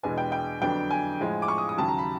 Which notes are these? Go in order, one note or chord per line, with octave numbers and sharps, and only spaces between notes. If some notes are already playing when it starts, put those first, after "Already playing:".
E2 B2 G#3 B3 D4 G#5
G5
G5
F2 D3 F#3 B3 D4 G5
G#5
A2 F3 G#3
D6
C#6
D#6
D#6
D#2 C#3 F#3 A5
A#5
B5